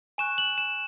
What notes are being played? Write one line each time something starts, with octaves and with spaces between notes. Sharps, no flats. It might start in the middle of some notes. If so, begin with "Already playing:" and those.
G#5 C#6 F#6 E7
F#7
E7